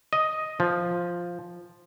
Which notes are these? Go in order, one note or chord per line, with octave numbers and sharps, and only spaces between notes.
D#5
F3